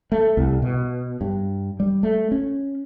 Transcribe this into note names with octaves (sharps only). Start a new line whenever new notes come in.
A3
C2
B2
G2
G3
A3
C#4